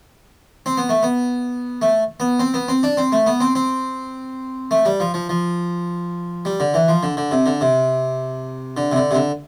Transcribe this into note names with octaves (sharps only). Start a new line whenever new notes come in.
C4
B3
A3
B3
A3
B3
C4
B3
C4
D4
C4
A3
B3
C4
C4
A3
G3
F3
F3
F3
G3
D3
E3
F3
D3
D3
C3
D3
C3
D3
C3
D3
C3
D3